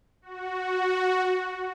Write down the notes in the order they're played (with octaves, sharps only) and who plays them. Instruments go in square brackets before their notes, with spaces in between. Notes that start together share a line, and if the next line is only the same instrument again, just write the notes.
[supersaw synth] F#4